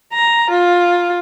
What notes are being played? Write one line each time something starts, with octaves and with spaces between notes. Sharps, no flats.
A#5
F4